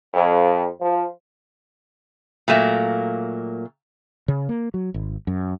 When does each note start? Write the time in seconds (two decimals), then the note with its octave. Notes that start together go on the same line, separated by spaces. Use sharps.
0.15 F2
0.82 F3
2.48 A#2 F#3 A3 A#3
4.28 C#3
4.49 A#3
4.74 F#3
4.94 G#1
5.27 F#2